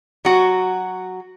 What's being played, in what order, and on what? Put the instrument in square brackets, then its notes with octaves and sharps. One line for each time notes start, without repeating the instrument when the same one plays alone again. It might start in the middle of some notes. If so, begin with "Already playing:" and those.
[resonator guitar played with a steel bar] F#3 F#4